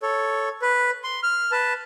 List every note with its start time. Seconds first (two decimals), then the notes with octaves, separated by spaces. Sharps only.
0.03 A4 C#5
0.62 B4
1.04 C6
1.23 F6
1.52 B4 A5